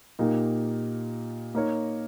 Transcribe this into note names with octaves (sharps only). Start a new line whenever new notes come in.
A#2 A#3 D#4 G4
A#3 D#4 A#4 C#5